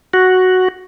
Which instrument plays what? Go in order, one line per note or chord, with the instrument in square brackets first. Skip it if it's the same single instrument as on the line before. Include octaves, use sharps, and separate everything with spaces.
[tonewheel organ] F#4